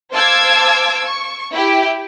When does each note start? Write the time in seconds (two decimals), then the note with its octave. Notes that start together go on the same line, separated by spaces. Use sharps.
0.13 C5 F5 A5 D6 E6 G#6
1.06 C#6
1.52 E4 G4